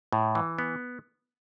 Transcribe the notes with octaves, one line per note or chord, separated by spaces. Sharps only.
A2
E3
B3